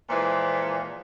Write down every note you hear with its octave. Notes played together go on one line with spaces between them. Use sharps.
A#2 E3 F3 G#3